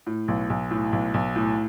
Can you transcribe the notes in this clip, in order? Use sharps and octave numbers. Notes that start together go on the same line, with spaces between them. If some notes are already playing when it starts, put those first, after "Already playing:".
A2
B1
B1
A2
B1
B1
A2